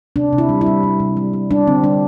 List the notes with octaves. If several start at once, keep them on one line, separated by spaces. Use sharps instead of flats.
C3 D4
C3
E4
G3
E4
G3
G3
C3
G3
G3
G3 D4
D3 C4
G3 D4